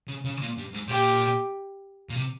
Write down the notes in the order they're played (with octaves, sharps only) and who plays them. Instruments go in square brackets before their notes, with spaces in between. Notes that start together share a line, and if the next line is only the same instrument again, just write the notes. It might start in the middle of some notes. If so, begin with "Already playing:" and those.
[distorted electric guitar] C#3
C#3
A#2
G2
G#2
[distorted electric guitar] A#2 [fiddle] G4
[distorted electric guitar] A#2
C3